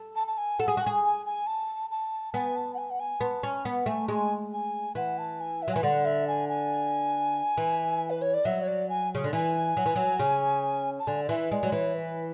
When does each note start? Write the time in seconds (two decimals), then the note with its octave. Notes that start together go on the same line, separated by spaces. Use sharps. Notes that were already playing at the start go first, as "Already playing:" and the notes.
Already playing: A4
0.15 A5
0.27 A5
0.37 G#5
0.59 A4 F#5
0.68 G#4
0.77 F#4
0.81 G#5
0.86 G#4
1.03 G#5
1.25 G#5
1.46 A5
1.90 A5
2.33 B3 G#5
2.55 A5
2.73 F#5
2.77 G#5
2.90 F#5
2.99 G#5
3.21 B3 A5
3.42 C#4 G#5
3.65 B3 F#5
3.86 A3 G#5
4.08 G#3 G#5
4.52 G#5
4.95 E3 F#5
5.18 A5
5.40 G#5
5.62 E5
5.68 F#3
5.72 E3 G#5
5.83 D3 F#5
6.05 E5
6.27 G#5
6.48 G#5
7.58 E3
8.10 B4
8.21 C#5
8.33 D5
8.45 F#3 E5
8.61 C#5
8.67 D5
8.89 G#5
9.15 C#3
9.24 D3
9.32 E3 G#5
9.77 F#3
9.86 E3
9.96 F#3
10.19 C#3
10.99 A5
11.07 D3 G#5
11.23 D5
11.29 E3 E5
11.51 G#3 D5
11.63 F#3
11.72 E3 C#5
11.94 B4